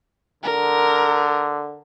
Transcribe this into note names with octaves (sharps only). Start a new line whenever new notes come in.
D3 A#4